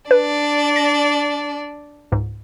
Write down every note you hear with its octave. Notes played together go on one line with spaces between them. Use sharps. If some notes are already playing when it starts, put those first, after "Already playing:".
D4 B4 D5
A#6
C#2 G#2